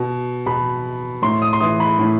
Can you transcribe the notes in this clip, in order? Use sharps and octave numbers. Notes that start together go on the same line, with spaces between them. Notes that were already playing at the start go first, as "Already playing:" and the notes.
Already playing: B2
B2 B5
A2 C6
D#6
C6
E3 D#6
B5
A2